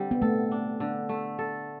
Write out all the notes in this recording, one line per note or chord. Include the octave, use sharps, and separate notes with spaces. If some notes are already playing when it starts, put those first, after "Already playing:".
Already playing: D3 G3 C4
B3
A3 A4
D4
D3
A3
A4